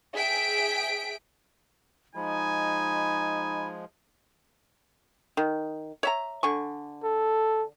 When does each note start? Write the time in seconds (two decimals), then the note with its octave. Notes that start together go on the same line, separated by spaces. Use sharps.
0.14 G#4 E5 G5 B6 D7
2.15 F3 G#3 D#4 G#5 B5
5.37 D#3
6.03 C#5 E5 A#5
6.43 D3 G#5 C#6
7.03 A4